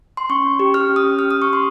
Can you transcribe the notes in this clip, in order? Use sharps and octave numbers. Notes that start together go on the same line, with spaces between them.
C6
C#4 C#6
C#4
G4
G4 F6
C#4
D#6
C#4
G4 F6
G4 D#6
C#6
C#4 C6